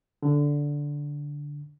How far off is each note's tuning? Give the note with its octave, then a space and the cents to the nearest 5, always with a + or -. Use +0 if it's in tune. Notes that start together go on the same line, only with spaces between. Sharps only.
D3 -10